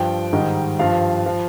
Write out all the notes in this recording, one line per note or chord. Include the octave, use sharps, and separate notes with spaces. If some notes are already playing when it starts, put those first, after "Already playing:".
Already playing: G2 F3 G5
G#2 D#3 G3
G2 F3 F5
F3